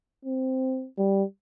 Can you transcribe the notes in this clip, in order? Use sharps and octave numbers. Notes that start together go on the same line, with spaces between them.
C4
G3